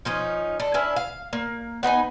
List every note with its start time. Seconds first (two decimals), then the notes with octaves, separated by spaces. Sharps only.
0.05 F3 C#4 D#4
0.60 D4 A4
0.74 C#4 D4 E4 B4
0.96 F5
1.33 A#3
1.83 B3 D#4 B4 G#5